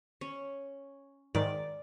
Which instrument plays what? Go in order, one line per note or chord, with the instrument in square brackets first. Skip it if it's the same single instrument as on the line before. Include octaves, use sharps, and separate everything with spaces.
[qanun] C#4
[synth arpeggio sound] G#2 D#3 [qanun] D5